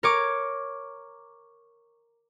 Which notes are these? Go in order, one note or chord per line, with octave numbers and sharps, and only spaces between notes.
A#4 C#5 D6